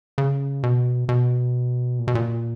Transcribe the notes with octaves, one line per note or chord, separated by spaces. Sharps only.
C#3
B2
B2
A#2
B2
A#2